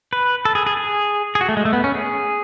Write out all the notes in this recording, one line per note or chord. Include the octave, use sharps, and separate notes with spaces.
B4
A4
G#4
G#4
G#4
G#4
F#4
A3
G#3
A3
B3
C#4
G#4